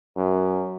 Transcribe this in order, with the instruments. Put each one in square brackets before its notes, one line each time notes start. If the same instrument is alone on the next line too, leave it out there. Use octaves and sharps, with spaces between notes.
[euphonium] F#2